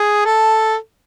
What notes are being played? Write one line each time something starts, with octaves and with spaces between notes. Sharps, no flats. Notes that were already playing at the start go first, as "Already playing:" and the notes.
Already playing: G#4
A4